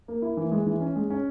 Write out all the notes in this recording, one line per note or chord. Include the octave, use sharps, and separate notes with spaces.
A#3
E4
E3
G#3
E3
C#4
G#3
C#4